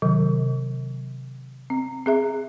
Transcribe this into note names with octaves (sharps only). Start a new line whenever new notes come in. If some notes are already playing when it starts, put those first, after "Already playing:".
C3 D#3 F#3
C4
C4 G#4 E5